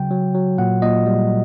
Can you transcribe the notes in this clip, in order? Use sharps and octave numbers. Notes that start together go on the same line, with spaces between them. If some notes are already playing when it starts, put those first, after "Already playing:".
Already playing: C#3 F#3 G5
F#3
F#3
A#2 F#5
A#2 D#5
G3